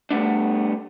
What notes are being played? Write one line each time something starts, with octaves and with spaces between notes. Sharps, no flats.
G3 A3 B3 D4